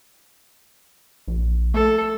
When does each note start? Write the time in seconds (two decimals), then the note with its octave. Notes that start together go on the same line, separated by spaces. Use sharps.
1.28 A#1
1.74 A3 A4